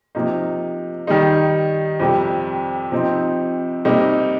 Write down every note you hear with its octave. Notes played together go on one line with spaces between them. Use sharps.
C3 F3 A#3 D#4
D#3 G3 D#4
F2 C3 G3
C3 F3 C4 D#4
C3 G3 A#3 D#4